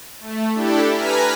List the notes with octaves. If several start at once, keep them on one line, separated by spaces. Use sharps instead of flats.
A3
D4 E4 G4 A4
B4 G#5 A#5 F6 B6